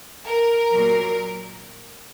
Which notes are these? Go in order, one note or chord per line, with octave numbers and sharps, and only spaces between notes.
A#4
A#2 F#3